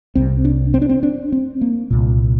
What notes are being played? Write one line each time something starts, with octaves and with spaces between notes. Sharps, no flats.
C2 C3 C4
D4
C4
D4
C4
D4
C4
A#3
C2 A#2